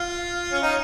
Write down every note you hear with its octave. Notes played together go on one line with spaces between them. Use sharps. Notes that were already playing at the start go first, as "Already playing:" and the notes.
Already playing: F4
C#4
D#4